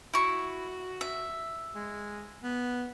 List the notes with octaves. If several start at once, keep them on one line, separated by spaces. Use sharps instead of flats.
E4 F#4 C#6
E5
G#3
B3